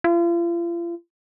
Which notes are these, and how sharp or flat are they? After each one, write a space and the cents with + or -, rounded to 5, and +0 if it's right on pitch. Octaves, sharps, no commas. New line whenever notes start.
F4 -40